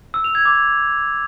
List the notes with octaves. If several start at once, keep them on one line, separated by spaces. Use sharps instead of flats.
E6
F7
G#6
D6